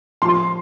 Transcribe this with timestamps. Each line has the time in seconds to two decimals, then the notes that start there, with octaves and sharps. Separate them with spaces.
0.22 F3 C6